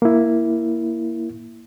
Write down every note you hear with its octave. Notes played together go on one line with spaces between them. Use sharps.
A#3 E4